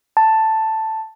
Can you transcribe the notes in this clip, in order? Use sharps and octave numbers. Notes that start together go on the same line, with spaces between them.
A5